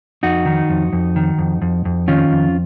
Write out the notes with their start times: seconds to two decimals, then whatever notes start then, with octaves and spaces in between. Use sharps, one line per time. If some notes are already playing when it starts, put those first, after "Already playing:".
0.23 F2 D#4 F#4
0.46 D#3
0.70 F2
0.93 F2
1.16 D#3
1.39 F2
1.62 F2
1.85 F2
2.08 D#3 C#4 F4
2.32 F2